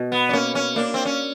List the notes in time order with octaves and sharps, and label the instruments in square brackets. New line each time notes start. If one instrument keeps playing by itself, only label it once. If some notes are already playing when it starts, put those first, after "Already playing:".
Already playing: [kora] B2
[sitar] B3
D4
[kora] A#3 [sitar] C#4
[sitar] C#4
[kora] A#3 [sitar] D4
[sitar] C4
C#4